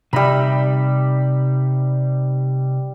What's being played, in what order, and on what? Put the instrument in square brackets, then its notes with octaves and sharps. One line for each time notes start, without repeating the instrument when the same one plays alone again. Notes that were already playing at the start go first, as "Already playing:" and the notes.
[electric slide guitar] C3 D#4 E5 [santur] G3 B5